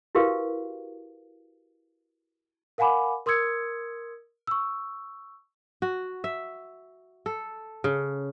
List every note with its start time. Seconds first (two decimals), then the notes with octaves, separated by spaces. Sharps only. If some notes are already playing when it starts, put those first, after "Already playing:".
0.15 E4 F#4 G4 A#4 B4 F5
2.78 A#4 F5 F#5 G#5 B5 D6
3.26 A#4 C6 D#6 E6 G#6 C#7
4.47 C#6 E6
5.82 F#4
6.24 E5
7.26 A4
7.84 C#3